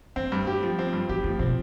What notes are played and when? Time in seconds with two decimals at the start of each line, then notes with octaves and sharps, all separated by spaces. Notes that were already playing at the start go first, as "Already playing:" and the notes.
0.16 A3 C4
0.32 G2
0.47 G4
0.63 F3
0.79 C4
0.93 G2
1.09 B3 G4
1.24 F3 A3
1.39 B2 C4